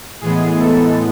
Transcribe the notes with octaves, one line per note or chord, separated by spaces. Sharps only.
A2 E3 G#3 B3 G#4
A4